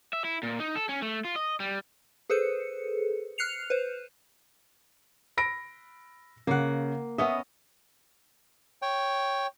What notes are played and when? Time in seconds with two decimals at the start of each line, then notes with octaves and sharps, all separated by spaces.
0.13 E5
0.24 E4
0.43 A#2
0.60 D#4
0.76 A4
0.89 C#4
1.02 A3
1.25 F4
1.36 D#5
1.60 G3
2.30 G#4 A4 B4 C5 C#7
3.38 F6 F#6 C7 C#7 F7
3.70 B4 C5
5.37 B5 A#6 D7
6.47 C#3 A#3 F#5
7.18 B3 C#4 D#5 E5
8.82 C#5 G5